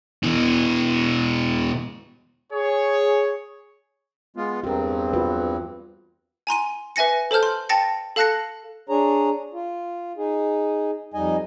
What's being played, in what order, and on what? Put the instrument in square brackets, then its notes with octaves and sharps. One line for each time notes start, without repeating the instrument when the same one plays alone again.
[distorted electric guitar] B2 E3
[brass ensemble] G#4 C#5
[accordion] G#3 B3 F4
[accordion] E2 G2 C4 [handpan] G4 A#4
[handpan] F4 F#4 B4
[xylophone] G#5 A#5 C6 D#7
B4 E5 G#5 A#6 C#7
A4 C5 A5 F6 G6
C6
G5 A5 A6 A#6 C#7
A4 F5 A5 F#6 A#6 C#7
[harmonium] D4 G#4 C#5 A#5
F4
D#4 G#4
F2 G3 D#4 D#5 G#5